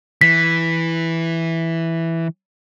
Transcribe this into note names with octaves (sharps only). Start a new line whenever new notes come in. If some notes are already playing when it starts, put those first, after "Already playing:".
E3 B6